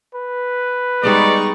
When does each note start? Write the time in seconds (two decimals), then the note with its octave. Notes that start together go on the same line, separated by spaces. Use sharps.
0.15 B4
1.03 G3 G#3 B3 D#4 D5 C#6